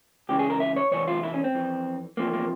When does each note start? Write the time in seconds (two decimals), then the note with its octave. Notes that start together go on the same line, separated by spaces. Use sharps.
0.29 C#2 C#3 E3 G4
0.39 G#4
0.50 A#4
0.60 E5
0.76 C#5
0.91 E2 C3 E3 C#5
1.08 F4
1.23 E4
1.34 C#4
1.44 C4
1.55 F2 E3
2.17 E2 C3 F3 A#3
2.33 A#3